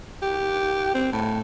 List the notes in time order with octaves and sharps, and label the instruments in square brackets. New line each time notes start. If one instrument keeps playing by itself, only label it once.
[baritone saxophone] G4
C4
A2